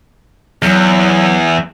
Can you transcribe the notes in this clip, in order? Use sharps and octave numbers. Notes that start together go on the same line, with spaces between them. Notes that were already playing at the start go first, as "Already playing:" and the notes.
E2 F#3